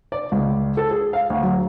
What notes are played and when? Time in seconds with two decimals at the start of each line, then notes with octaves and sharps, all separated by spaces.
0.12 D5
0.32 C#2
0.77 A4
0.91 G#4
1.13 F5
1.30 D2
1.43 F#3